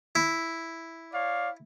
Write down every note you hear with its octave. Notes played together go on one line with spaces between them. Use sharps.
E4
C#5 D5 F5